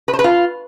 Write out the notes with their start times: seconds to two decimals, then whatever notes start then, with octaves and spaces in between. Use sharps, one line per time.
0.08 B4
0.13 C5
0.19 B4
0.24 F4